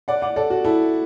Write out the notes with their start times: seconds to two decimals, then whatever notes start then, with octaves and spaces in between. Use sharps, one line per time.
0.08 D5 F#5
0.22 D5 F#5
0.36 A4 D5
0.50 F#4
0.65 E4 A4